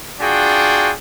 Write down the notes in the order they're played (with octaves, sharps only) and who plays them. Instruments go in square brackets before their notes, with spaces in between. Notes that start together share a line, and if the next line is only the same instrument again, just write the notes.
[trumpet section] D4 F4 F#4 G#4 G5